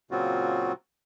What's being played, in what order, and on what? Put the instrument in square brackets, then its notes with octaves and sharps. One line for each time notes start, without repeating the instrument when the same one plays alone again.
[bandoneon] A#2 C#3 F#3 C4 F4 F#4